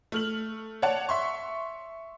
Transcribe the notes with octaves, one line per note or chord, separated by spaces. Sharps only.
A3 F6 F#7
C#5 D5 F#5 A5
E5 C6 C#6